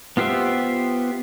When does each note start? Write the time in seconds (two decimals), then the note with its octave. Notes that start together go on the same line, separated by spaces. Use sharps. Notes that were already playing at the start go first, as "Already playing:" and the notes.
0.17 B3 F4 G4 C5 E5